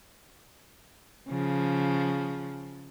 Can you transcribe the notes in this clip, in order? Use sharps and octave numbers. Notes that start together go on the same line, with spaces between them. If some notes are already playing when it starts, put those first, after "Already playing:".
C#3 F3